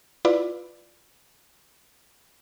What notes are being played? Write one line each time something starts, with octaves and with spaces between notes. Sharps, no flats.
E4 F4 B4 D5